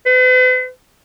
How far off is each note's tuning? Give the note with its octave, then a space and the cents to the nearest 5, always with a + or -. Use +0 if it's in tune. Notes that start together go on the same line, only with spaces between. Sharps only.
B4 +45